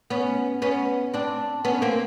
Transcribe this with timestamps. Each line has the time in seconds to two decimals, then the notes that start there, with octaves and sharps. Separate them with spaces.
0.10 B3 C#4
0.62 B3 C#4
1.14 C4 D4
1.65 B3 C#4
1.82 A#3 C4